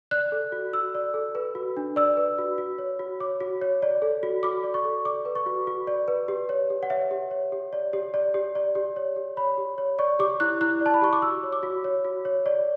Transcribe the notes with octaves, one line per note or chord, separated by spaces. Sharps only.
D5 F#6
A4
F#4
F#4 E6
D5
A4
B4
F#4
D4
D5 E6
B4
F#4
F#4
C#5
F#4
C#5 D6
F#4
C#5
D5
A4
F#4
F#4 D6
D5
C#6
A4
D5 D6
B4
C#6
F#4
F#4
D5
B4
G4
C#5
G4
F#5
C#5 E5
G4
C#5
G4
D5
G4
D5
G4
D5
G4
C#5
G4
C#5 B5
G4
C#5
D5 C#6
G4 D6
E4 F#6
E4 F#6
D5 A5
B5
G4 C#6
D6
F#4 E6
C#5
D6
F#4
C#5
F#4
C#5
D5